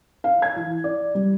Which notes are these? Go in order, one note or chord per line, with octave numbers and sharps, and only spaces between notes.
F5
G#6
E3
D5
G3